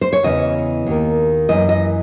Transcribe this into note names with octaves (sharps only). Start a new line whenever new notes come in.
C5
C#5
E2 C#3 E3 D#5
D#2 D#3
F#2 E3 D#5
D#5